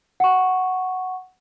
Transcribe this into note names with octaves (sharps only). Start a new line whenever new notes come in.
F#5 C#6